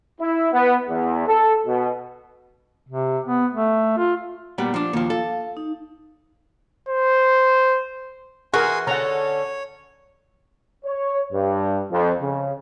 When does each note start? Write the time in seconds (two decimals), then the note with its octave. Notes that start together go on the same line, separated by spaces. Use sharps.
0.20 E4
0.52 B3
0.88 E2
1.27 A4
1.66 B2
2.87 C3
3.25 B3
3.53 A3
3.97 F4
4.58 A#2 G3 B3
4.74 F3 D4
4.93 D#2 F3 A#3 F4
5.10 A4 F5
5.57 D#4
6.89 C5
8.54 E3 F#4 G#4 A#4 G#5 C6
8.87 D3 C#4 A4 C#5 F#5 A#5
10.85 C#5
11.33 G2
11.91 F2
12.21 C#3